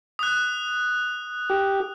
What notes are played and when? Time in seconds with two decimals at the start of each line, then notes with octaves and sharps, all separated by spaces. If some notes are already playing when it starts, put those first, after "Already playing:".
0.19 D#6 F#6
1.50 G4